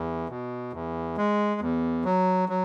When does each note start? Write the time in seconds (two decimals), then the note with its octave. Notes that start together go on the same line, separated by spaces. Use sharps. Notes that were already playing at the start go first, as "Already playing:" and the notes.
Already playing: E2
0.29 B2
0.73 E2
1.17 G#3
1.61 E2
2.04 F#3
2.49 F#3